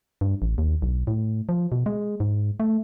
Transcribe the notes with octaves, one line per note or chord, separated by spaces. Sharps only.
G2
A1
D#2
B1
A2
F3
B2
G#3
G#2
A3